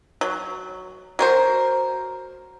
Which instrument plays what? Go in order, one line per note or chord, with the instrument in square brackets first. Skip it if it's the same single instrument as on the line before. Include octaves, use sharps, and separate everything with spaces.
[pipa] F#3
F#3 A#4 C5